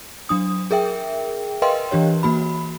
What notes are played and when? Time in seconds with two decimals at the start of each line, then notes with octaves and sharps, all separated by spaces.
0.29 F#3 D4 D#6
0.71 G#4 A#4 E5 G5
1.62 A#4 B4 D#5 F5 G5 C6
1.91 E3 D4 G4 C#5
2.23 E3 A#3 F#4 B5